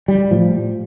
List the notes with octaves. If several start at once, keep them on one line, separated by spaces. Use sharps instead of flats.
G3
A2 F3